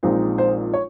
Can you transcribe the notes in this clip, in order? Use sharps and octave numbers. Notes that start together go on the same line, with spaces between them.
A#1 A#2 G#3 C4 D#4 C5
C5
C#5